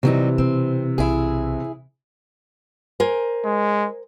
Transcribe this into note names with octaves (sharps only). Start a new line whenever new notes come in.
C3 E3 F#3 G3 D#4
B2 C4
B1 E4 G#4
A#4 C5 G#5
G#3